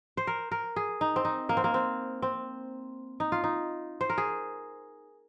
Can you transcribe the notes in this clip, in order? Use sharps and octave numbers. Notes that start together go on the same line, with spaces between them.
C5
A#4
A#4
G#4
D#4
C4
D#4
A#3
C4
A#3
C4
C4
D#4
F4
D#4
C5
A#4
G#4